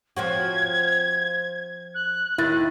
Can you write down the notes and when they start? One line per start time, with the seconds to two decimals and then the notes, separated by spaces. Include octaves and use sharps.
0.17 F3 C4 F#4 G#6
1.94 F#6
2.38 D#2 D#3 E4 A6